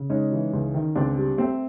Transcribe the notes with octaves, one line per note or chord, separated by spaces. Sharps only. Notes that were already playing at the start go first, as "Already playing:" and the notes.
Already playing: C#3
G#3 C#4 D#4
E3
C#2
D#3
C#2 C4 D4
G3
A3 C4